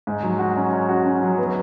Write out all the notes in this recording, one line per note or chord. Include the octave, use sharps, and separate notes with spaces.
G#2
F#3
F#4
C#4
C#4
F#4
C#4
F#3
B3